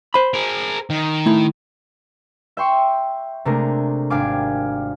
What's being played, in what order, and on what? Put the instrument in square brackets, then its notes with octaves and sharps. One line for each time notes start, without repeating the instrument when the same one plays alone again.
[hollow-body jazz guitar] C5 B5
[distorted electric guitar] G#4 A#4
D#3
[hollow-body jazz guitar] A3 E4
[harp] E5 G5 C6 C#6
C3 G#3 A3 D4 G#4 A#4
G#1 D4 G4 F5 G#5 D6